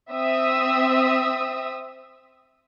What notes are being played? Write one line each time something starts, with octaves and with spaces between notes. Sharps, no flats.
C4 E5 D#6 E6